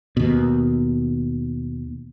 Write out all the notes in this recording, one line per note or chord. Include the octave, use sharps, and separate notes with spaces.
D#2 B2